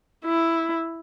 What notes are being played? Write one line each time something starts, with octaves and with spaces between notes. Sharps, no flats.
E4